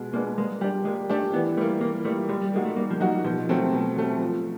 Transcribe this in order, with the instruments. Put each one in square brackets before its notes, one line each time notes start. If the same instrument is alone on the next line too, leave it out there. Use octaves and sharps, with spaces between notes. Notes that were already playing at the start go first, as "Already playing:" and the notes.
Already playing: [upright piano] B2 G#3 B3
[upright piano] G#3 B3 D4 [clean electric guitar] A#3
[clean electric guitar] G#3 [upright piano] A#3
[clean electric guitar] G3 [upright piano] D4 G4
[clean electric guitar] G#3 [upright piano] A#3
[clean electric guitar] A3 [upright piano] D4 G4
[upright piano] E3 [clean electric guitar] B3
[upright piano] G3 A#3 [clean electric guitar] A3
[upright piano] E3 [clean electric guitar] A#3
[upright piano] G3 A#3 [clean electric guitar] A3
[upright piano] G3 [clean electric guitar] G#3
[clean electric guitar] G3
[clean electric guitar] G#3 [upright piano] A#3 D#4 F#4
[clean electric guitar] A3
[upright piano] G3 [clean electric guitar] A#3
[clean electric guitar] F3
[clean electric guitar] F#3 [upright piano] A#3 D#4 F#4
[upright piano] B2 [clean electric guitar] F3
[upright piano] F#3 A3 C4
B2
F#3 A3 C4
F3